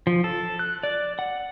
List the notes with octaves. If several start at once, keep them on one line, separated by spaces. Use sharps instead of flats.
F3
A4
F#6
D5
F#5